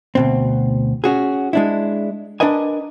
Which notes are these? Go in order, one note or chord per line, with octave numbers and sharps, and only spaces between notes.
D2 B2 C4
C#4 F#4 G#4
G#3 D4 E4
D4 A#4 B4 D#5 G#5